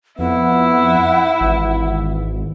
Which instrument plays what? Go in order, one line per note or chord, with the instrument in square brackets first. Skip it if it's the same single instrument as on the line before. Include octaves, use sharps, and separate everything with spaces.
[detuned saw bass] F2 [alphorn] B3 [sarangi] E4 [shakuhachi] F#5
[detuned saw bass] G#1 [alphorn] E3